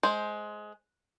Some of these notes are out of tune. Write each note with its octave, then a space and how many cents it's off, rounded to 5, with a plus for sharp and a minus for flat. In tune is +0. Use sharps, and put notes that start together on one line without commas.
G#3 +20 C5 +0